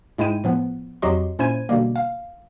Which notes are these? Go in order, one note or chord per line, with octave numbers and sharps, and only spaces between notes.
G#2 G#3 E4 G5 D#7
A2 F3 B3
F2 F#3 F#4 G4 D#5 C6
A#2 C#4 E4 C5 G#6 D#7
B2 D3 G3 A#3
F5